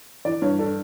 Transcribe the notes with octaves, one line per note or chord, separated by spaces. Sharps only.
E3 D5
G2 C#5
D4 A4